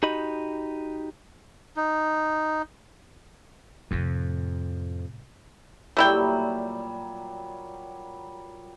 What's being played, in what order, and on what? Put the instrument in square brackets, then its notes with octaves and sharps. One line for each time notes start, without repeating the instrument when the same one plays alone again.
[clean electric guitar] D#4 F#4 G4 D#5 B5
[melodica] D#4
[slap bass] F2 [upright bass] A2 C3
[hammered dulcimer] A#2 F#3 G3 [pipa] A3 E4 G5